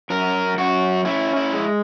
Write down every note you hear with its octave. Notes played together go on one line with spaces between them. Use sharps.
F#2 A#4
F#2 F#4
C#4 E4
E4
G#3